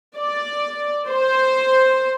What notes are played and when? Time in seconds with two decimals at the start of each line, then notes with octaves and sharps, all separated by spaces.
0.17 D5
1.08 C5